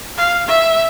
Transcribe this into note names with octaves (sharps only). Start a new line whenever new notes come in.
F5
E5